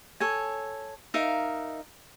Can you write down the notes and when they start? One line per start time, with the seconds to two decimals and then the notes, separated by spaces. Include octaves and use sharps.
0.20 A4 C#5 G#5
1.14 D#4 A#4 E5 F5